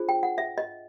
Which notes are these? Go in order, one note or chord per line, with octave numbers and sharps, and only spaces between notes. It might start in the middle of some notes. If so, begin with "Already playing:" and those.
Already playing: D4 F4 G#4 C5
G5
F#5
E5
D#5